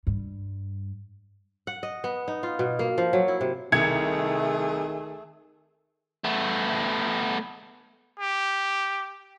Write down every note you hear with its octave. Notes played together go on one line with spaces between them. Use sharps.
G2
F#5
D#5
B3
D#4
F4
B2
A#3
F3
F#3
E4
C3
C2 D#3 A3 G#4 G#6 C#7
A3 B3
G4